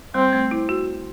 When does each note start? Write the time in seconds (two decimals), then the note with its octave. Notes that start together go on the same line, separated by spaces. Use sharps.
0.14 G3 C4
0.33 A3
0.51 E4
0.69 F#4